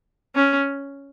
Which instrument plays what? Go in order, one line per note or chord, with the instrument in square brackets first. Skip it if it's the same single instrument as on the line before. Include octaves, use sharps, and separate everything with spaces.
[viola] C#4